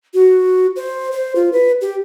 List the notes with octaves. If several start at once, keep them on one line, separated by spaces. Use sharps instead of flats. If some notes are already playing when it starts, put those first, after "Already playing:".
F#4
C5
C5
F4
B4
G4